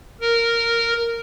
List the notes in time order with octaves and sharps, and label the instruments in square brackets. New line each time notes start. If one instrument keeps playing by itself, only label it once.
[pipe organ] A#4